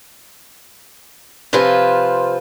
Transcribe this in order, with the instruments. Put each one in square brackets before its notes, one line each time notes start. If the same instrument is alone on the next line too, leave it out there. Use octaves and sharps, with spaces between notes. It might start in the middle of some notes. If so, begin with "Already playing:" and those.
[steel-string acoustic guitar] C3 F3 F4 B4 C5 G#5